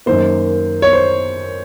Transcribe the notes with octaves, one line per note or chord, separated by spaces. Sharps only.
F#2 D#3 A#3 C5
C#5
C5